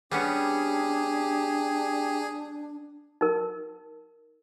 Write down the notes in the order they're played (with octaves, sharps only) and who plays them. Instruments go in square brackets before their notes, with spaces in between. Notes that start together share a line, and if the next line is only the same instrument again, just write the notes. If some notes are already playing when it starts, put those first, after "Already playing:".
[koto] G3 B3 C#4 [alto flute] D4 [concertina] G4 [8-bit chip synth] G#4
[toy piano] D#4 A#4